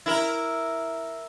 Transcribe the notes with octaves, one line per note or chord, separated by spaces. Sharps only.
E4 A#4